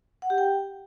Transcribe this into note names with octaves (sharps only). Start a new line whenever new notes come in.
F#5
G4
G5